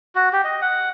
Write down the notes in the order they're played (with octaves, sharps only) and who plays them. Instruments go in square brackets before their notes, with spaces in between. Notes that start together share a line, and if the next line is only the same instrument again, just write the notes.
[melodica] F#4
G4
D#5
F#5